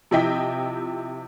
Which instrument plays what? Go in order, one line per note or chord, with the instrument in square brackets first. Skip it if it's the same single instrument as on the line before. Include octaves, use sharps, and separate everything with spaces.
[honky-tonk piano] C3 F3 E4 D#5 G5 B6